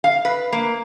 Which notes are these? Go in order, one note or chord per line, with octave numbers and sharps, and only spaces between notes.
F5
B4
A#3